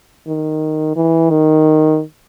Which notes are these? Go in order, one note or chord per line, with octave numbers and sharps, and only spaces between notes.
D#3
E3
D#3